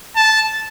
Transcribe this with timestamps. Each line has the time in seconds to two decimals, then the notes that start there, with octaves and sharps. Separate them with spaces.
0.16 A5